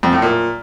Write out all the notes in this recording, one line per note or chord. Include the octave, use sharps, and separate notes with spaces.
F2
A2
A#2